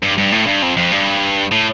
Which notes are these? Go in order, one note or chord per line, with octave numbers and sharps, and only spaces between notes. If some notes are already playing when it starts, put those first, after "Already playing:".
G2
G2
A2
G2
F2
F2
G2
A2